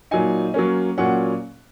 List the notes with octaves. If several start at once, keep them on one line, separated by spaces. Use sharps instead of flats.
A#2 F#3 D#4 G#5
F#3 A#3 C#4
A#2 F#3 C#4 F#5